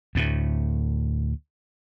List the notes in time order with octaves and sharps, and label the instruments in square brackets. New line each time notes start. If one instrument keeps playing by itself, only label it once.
[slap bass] D2 A2